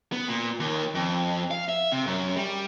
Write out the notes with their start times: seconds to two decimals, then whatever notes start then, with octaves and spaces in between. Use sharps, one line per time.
0.12 B3
0.28 A#2
0.60 D#2
0.95 F2
1.51 F5
1.69 E5
1.92 C3
2.06 F#2
2.37 G3